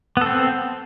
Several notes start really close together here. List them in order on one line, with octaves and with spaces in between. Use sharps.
B3 A4 C4